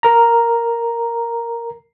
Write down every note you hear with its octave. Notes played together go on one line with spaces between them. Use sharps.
A#4 A#5